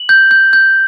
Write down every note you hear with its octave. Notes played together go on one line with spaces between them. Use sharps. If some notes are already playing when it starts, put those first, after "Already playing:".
Already playing: F#7
G6
G6
G6